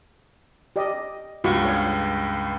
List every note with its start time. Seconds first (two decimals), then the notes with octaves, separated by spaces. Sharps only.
0.76 G4 D5 D#5
1.44 C#2 G2 F4 F#4 C#6
1.63 G#4 C#5 F5